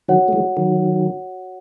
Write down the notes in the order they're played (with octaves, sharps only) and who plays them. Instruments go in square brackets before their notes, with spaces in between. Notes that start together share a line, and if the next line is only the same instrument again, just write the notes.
[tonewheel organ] D#3 F#3 [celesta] F#4 C#5 F#5
[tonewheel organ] A3
E3 G#3
D#3 F#3